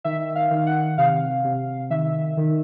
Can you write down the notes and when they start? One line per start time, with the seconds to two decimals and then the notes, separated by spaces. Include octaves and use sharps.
0.04 D#3 E5
0.35 F5
0.51 D#3
0.67 F#5
0.98 C3 F5
1.44 C3
1.90 D#3 E5
2.37 D#3